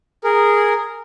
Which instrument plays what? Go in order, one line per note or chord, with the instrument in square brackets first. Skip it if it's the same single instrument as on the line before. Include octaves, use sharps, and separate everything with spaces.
[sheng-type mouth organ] G#4 A#4